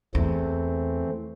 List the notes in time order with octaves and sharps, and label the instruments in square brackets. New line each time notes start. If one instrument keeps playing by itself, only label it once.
[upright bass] E2 [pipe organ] E3 A3 C4